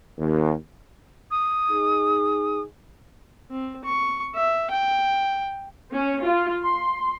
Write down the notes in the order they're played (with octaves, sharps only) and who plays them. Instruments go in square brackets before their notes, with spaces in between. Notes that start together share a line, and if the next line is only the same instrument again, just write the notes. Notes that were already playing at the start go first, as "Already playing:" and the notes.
[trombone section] D#2
[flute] D#6
[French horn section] D#4 G#4
[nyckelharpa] C4
C#6
E5
G5
[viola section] C#4
F4
C6